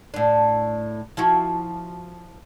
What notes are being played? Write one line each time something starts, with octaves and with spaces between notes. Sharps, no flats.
A2 D4
F3 E4 F#4